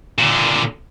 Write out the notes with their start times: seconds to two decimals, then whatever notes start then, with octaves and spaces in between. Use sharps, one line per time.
0.19 A#2 D3